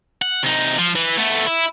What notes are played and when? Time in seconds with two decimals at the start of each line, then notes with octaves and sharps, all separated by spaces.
0.22 F#5
0.43 C3 D#4
0.79 F3
0.95 E3
1.17 A3 B3
1.47 E4